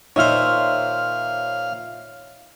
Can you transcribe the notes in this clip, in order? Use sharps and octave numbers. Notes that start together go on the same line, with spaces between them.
A#2 D#4 F4 C5 C#5 E5 F5 F6